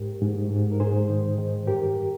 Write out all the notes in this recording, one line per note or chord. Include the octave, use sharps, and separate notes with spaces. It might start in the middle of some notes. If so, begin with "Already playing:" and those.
Already playing: G#2 G4 A#4
G#2
G#2
A#4
G#2 G#4 C5
D#3
D#3
G2 G4 A#4